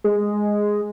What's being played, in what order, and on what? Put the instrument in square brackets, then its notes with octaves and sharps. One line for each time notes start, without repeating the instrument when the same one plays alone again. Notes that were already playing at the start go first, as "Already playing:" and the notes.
[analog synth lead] G#3